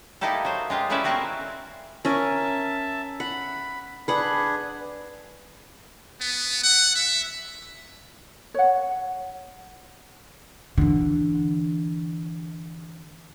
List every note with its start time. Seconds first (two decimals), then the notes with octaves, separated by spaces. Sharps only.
0.21 A#3 D#4 E4 G4 A4
0.45 F#3 C5
0.70 G#3 F4 G4
0.90 A3 C#4 E4 B4 D5 E5
1.04 B3 C4 F#4 A#4 C#5
2.05 C#4 A#4 E5 G#5 A5
3.20 F#5 B5
4.08 D4 G#4 B4 F#5
6.20 B3
6.63 F#5
6.95 E5
8.54 C#5 F#5
10.78 D3 E3